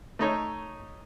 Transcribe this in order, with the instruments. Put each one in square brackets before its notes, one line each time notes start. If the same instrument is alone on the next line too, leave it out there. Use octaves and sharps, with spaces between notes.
[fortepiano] A3 D#4 C#5